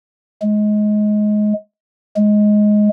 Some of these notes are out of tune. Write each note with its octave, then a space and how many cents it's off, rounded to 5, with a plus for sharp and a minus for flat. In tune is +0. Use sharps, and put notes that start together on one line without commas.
G#3 +20
G#3 +10